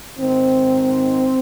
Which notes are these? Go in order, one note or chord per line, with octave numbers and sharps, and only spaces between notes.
G#2 D#3 C4